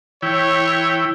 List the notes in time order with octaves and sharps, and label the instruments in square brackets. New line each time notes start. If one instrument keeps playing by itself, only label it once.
[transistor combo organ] E3 E4 G5 [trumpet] C#5